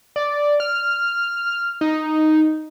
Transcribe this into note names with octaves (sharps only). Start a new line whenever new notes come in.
D5
F6
D#4